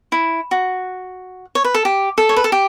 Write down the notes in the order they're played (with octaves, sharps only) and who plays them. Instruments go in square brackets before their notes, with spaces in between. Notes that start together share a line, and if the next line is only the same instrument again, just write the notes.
[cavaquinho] E4
F#4
C#5
B4
A4
G4
A4
C#5
B4
A4
G4